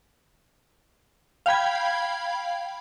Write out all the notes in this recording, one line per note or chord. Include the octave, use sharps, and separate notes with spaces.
F5 G5 B5 G#6